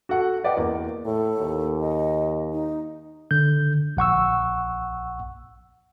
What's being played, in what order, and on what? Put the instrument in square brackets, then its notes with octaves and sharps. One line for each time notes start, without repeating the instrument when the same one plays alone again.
[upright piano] F#4 A4 F#5
B4 D5 D#5 F#5 G5
E2 A#3
[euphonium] A2 [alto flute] A4
[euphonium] D#2
[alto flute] D#5
D#4
[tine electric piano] D3 G6
A#1 F#5 C#6 E6